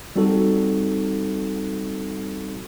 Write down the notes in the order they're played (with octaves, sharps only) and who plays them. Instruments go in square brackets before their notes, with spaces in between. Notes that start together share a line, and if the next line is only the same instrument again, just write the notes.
[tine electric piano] G3 C4 D#4 F#4 A4